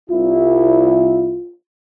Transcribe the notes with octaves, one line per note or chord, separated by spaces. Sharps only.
C2 E4 F4